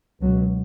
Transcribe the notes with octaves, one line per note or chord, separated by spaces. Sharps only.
C#2 B2 F#3